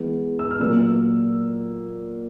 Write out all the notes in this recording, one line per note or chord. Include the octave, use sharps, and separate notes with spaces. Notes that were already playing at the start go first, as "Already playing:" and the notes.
Already playing: E3 G#3 B3
E6
F6
A#2 F#3 A#3 E6